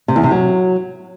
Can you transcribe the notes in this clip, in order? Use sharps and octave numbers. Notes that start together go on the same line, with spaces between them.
C3
E2
C3
F#3